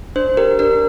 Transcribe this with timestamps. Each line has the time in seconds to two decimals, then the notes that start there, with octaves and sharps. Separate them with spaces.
0.16 D4 C5
0.37 G4 A#4
0.59 D4 A#4